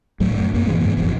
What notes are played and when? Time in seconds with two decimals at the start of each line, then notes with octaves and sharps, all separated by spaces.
0.20 D2 A2 F#3 A3
0.36 F#2
0.54 A#1 F#2 A#3
0.67 B2 D#3 E3 G#3
0.80 E2 G2 C#3 B3
0.97 F1 A#1 E2 B2